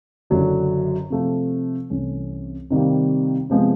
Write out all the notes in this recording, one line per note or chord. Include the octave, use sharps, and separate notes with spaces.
F#1 F#2 D3 F#3
C3 F3 A3
C2 C3 E3 A3 C#4
C3 D#3 G3 A#3
C3 F3 G#3 B3